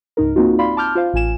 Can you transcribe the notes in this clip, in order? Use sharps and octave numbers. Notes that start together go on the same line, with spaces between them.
C#2 G#2 D#4 A#4
A#3 C4 D#4 F4 F#4
D5 F5 B5 C6
A5 D6 F6 G6
F4 C5 F5
A1 F4 G#5 E7